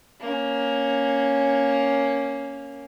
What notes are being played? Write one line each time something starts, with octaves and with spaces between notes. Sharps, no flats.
A#3 C#4